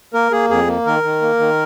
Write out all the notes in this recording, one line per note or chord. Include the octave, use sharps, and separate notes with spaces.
A#3 A#4
A#3 G#4
F2 G#4
A#3
D#3 A#4
D#3
A#3
D#3